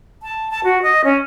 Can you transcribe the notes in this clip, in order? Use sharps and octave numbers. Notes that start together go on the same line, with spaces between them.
A5
A5
F#4
D#5
C#4